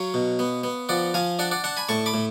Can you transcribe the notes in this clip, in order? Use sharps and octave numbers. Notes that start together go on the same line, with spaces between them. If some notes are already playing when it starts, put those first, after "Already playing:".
Already playing: F#3 C#5 F5
B2
B3
B3
F3 D5 F#5
F3 F5 G#5
D4 D5 F#5
D5 F#5
D4 F#5 A5
G#5 B5
A2 A5 C#6
B5 D6
A2